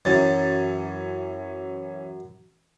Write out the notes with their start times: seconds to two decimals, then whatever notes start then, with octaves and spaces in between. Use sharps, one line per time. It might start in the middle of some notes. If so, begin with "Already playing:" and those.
0.05 F#2 E3 C#4 A6